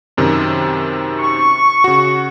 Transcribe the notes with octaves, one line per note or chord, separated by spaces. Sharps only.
F#2 C3 D#3
C#6
C#3 F#4